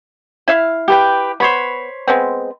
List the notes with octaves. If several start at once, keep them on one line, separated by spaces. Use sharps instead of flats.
E4 E5 F5
G4 B4 G5
B3 C5 C#5 B5
G#3 B3 C4